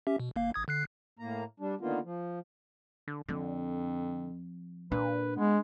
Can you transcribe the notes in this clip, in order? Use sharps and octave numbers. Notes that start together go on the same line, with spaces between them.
C#4 G4 E5
B2
G1 A#3 F5
A1 D#6 G#6
D3 F#6 C7
A2 A#3 A#5
G3 D4
D3 D#3 A#3 B3 F4
F3
D3
F2 D3 F3 C4
A#2 D4 B4
G#3 B3